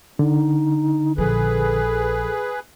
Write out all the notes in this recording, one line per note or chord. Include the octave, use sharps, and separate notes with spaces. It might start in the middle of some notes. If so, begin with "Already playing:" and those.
D3 D#4
A#1 F3 G#4 A4 B4